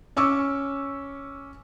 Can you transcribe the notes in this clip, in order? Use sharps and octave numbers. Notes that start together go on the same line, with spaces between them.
C#4 C#6 D6 E6